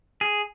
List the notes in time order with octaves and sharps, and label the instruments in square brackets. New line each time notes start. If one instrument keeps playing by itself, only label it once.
[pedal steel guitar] G#4